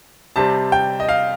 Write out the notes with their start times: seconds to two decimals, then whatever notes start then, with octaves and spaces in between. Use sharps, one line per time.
0.36 C3 G3 C4 A5
0.72 G5
1.00 D#5
1.09 F5